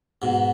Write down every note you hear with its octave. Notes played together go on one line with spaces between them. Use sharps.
G#2 B2